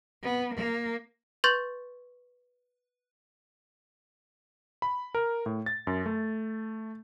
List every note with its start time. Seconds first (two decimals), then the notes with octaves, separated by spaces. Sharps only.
0.22 B3
0.54 A#3
1.44 B4 C6 C#6 G6 A6 F#7
4.82 B5
5.15 A#4
5.46 A2
5.66 A6
5.87 F#2
6.06 A3